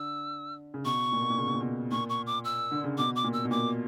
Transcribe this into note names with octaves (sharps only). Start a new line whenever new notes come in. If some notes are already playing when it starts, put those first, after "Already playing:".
Already playing: D3 E6
C#3
B2 C#6
A#2
B2
A#2
C#3
B2
A#2
B2
A#2 C#6
C#6
D6
E6
D3
C#3
B2 D6
D6
A#2
E6
B2
A#2 D6